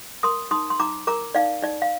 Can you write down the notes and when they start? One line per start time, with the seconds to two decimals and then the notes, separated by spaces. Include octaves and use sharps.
0.23 A#4 C6 D#6
0.51 D#4 C6 D#6
0.70 C6
0.80 D#4 A#5 D6
1.07 A#4 A#5 D6
1.35 D#4 D5 F5
1.62 D#4 D5
1.82 F5